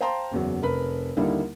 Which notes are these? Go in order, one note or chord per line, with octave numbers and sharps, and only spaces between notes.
C5 F5 G5 A5 A#5 C6
F#1 E2 F#3
F1 A#4 B4 B5
D#2 D3 G3 A#3 D#4 E4